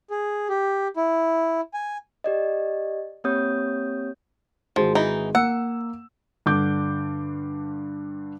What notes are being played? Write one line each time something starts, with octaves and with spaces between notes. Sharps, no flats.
G#4
G4
E4
G#5
G4 D5 D#5
A#3 C4 G4 C#5 D#6 G6
G#1 F3 G#3 F#4
E3 D#4
A#3 F#5 E6
G2 D3 D6 G6